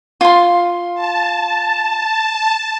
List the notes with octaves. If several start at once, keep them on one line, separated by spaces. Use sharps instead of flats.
F4 C6
A5